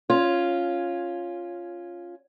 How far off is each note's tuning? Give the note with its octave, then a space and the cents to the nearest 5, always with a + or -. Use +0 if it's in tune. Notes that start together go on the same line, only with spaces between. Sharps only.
C#4 +0 F4 +0